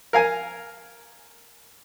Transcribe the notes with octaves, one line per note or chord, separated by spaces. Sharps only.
A#4 F5 G#5